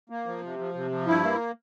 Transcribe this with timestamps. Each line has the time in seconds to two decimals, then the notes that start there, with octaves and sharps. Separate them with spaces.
0.10 A#3
0.26 F3
0.43 C3
0.59 F3
0.74 C3
0.91 F3
1.06 G2 E4
1.23 A#3